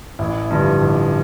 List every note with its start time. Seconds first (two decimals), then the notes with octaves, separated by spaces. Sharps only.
0.19 A1 E4
0.51 G2 D3 F3
0.82 A1